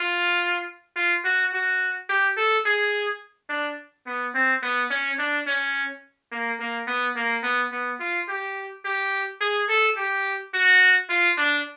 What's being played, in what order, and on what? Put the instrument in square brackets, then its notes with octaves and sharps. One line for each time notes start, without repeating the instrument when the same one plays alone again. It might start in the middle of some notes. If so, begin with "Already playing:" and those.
Already playing: [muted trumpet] F4
F4
F#4
F#4
G4
A4
G#4
D4
B3
C4
B3
C#4
D4
C#4
A#3
A#3
B3
A#3
B3
B3
F4
G4
G4
G#4
A4
G4
F#4
F4
D4